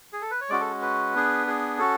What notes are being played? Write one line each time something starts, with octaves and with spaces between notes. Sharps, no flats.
G#4
A4
B4
C#5
G#3 C#4 F#4 D5
A4
B4
B3 D4 G#4
G#4
C#4 F#4 A4